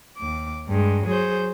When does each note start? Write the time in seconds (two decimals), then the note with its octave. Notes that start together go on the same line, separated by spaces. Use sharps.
0.19 D#2 D6
0.69 G2 G#3
1.08 F#3 G#4 C5 G6